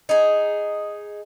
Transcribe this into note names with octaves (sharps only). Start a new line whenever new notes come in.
D#4 G#4